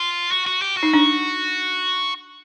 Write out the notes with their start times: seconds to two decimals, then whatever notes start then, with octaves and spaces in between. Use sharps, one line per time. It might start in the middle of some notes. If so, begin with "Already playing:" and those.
Already playing: F4
0.31 F#4
0.47 F#4
0.62 G4
0.77 F#4
0.83 D#4
0.94 D4